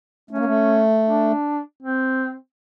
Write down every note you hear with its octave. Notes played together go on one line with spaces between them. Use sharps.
A3 C#4
A#3
A3
D4
C4